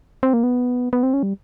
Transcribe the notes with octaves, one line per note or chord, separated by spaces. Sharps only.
C4
A#3
B3
B3
C4
C#4
G3